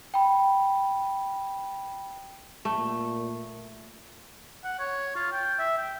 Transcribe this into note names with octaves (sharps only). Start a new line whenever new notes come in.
G5 B5
A#2 A3
F#5
C#5
F4
G5
E5
G5